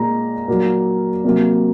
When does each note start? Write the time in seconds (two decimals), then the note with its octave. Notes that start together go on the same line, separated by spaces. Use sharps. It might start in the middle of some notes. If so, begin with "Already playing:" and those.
Already playing: A#2 G#3 A#5
0.48 A#2 F#3 A#3
1.24 C3 F#3 A#3